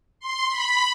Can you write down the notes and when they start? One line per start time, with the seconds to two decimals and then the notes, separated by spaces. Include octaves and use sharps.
0.20 C6
0.49 B5